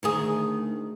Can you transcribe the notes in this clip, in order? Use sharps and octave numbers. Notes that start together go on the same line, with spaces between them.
D2 D#3 G#4